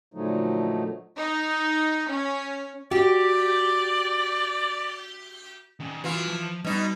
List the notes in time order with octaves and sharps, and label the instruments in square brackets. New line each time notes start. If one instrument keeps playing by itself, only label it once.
[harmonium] A#2 D3 F3 F#3 A3 D#4
[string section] D#4
C#4
[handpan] F#4 [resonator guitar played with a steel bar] G4 [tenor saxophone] D5
[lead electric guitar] D#3 C#4
[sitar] E3 F4 [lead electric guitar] F#4 G#5
[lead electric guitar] F3
[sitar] B2 D#4 [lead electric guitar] G3